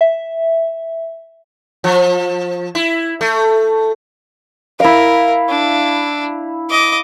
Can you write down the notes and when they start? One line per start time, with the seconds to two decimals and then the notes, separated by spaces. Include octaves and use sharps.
0.01 E5
1.84 F3
2.75 E4
3.21 A3
4.80 E4 A#4 F5
5.49 D4
6.70 D#5 D6